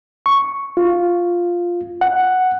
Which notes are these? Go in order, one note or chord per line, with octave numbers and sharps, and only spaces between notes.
C#6
F4
F#5